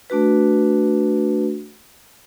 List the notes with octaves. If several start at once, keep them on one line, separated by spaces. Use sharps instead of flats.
A3 D4 F#4 B4